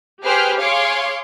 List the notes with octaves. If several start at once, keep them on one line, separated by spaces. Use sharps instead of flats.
G4 G#4 B4 C5 G5 F6
G#4 C#5 F5 C6 D6